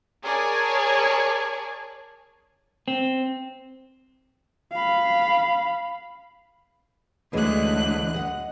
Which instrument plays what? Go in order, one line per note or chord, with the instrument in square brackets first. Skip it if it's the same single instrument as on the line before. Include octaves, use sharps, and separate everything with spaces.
[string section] G#4 A#4 C#5 D5 G#5 A5
[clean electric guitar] C4
[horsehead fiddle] F5 B5
[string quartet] D2 F#6 [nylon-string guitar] E3 G#3 C#4
[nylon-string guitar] D#5 F#5